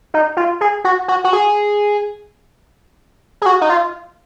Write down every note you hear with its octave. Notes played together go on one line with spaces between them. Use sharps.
D#4
F4
G#4
F#4
F#4
F#4
G#4
G#4
F#4
D#4
F4